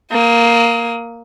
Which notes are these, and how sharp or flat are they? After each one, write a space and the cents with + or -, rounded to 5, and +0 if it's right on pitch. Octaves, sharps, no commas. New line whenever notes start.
A#3 +0 D#6 +30